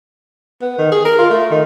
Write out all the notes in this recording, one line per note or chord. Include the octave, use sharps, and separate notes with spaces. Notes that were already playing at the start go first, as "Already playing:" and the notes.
B3
D#3
G#4
A#4
F4
A3
D#3